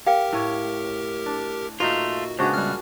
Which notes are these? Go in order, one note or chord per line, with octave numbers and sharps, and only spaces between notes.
G4 A#4 F5 G5
A2 C#5
D4
A#2 A3 D#4 F4 F#4 B4
C#2 B3 D4 F#4 G#4 C5
G3 F6